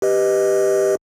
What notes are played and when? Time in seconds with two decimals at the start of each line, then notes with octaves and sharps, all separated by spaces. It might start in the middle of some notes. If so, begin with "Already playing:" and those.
0.02 G4 B4 D#5